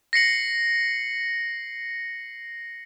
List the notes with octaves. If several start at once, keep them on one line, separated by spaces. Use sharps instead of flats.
A#6 C7 C#7 F#7